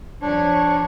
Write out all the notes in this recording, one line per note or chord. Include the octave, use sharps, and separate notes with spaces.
F2 D4 C#5